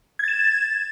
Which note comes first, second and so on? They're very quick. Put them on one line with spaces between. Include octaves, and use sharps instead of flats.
G#6 A6 E7